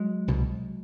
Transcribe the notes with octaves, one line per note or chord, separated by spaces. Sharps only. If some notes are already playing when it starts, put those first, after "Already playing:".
Already playing: F#3 G#3
C2 B2